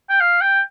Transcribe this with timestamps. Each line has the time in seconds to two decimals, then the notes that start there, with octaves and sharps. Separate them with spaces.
0.09 G5
0.20 F5
0.41 G5